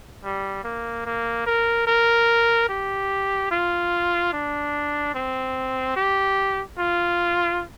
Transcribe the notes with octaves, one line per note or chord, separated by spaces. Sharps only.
G3
A#3
A#3
A#4
A#4
G4
F4
D4
C4
G4
F4